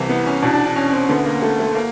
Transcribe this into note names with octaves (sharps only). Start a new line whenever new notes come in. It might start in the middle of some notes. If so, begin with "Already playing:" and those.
Already playing: C2 C3 E3
B3
C#4
E2 B2 D4
D4
D4
C#4
C4
D2 D3 B3
A#3
A3
A3
A#3